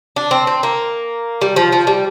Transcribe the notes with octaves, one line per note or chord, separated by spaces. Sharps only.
D4
C4
C4
A#3
G3
F3
F3
G3